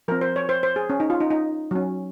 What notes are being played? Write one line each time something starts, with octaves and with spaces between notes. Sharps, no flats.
F3 C4 A#4
C5
C#5
C5
C5
G#4
C#4
D#4
F4
D#4
D#4
F#3 C#4